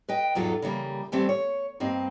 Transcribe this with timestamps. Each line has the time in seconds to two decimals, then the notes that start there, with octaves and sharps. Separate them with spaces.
0.09 B4 D#5 G5
0.35 E2 G#2 F#3 F4 A4 F5
0.62 C#3 E3 G3 A#3
1.12 E3 G3 A3 C4
1.29 C#5
1.80 G2 A#3 C4 D#5